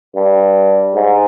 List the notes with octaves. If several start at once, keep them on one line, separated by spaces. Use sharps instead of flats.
G2
G#2